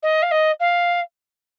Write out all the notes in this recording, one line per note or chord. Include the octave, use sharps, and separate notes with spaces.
D#5
F5
D#5
F5